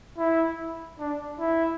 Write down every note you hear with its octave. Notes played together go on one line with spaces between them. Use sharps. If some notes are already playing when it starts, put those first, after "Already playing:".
E4
D4
E4